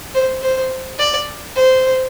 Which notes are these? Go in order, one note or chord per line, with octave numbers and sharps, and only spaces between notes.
C5
C5
D5
C5